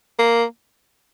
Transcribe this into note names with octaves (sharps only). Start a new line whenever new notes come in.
A#3